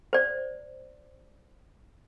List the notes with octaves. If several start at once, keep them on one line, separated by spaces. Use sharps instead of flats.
C5 D5